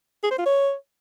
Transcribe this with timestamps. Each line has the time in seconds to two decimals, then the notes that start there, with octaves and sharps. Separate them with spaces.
0.23 G#4
0.31 C5
0.38 F4
0.46 C#5